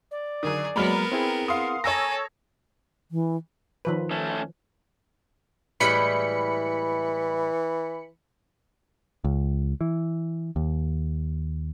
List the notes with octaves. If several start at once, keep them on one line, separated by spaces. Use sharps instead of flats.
D5
D3 D#3 F#3 G#4 D#6
F#3 G#3 A#3 B3 A#4 A#5 B5 F6
C4 E4 G#4 G5
F5 F#5 C6 D#6
A4 C#5 G#5 A#5 E6 A#6
E3
D#3 F3 B4
A3 C#4
A2 E3 G3 G#3 B5 C#7
C#2
E3
D#2